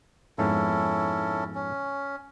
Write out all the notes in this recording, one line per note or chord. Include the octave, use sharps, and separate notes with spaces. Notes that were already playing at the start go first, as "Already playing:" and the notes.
F2 G#2 B3 C#4 E4 A4
C#4